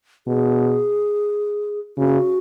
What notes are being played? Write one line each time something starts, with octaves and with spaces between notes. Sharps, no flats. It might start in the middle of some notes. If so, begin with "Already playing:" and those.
B2 G#4
C#3 F#4